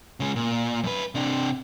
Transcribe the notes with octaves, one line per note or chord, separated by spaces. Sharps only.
C#3 G#3
A#2
F#2 B4
C3 D4